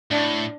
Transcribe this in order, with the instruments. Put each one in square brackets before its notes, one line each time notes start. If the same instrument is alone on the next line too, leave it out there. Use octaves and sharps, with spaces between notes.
[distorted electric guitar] A2 [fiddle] D4